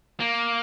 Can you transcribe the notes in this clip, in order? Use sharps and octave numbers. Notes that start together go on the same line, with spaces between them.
A#3